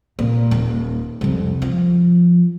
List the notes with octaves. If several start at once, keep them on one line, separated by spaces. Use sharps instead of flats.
A#2
D#1
C2 F2
F3